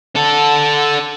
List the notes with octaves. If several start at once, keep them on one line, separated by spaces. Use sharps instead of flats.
D4 A4